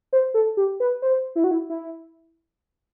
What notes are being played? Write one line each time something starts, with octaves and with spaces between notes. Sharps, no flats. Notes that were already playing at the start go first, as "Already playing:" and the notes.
C5
A4
G4
B4
C5
E4
F#4
E4
E4